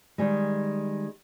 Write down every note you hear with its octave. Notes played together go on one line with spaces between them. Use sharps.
D#3 G3 G#3